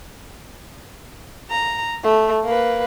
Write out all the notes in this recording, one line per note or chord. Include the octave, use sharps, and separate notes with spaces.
A#5
A3
A#3 B4